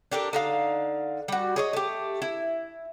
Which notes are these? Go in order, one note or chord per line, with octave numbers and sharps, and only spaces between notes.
D4 G4 A4 A#4
D3 D#4 F5
G3 F#4
G#4 C#5 D#5
A3 G4
E4